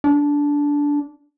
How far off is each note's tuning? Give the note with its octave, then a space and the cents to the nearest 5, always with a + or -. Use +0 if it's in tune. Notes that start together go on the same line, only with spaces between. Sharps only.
D4 -15